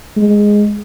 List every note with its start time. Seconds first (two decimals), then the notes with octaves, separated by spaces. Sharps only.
0.17 G#3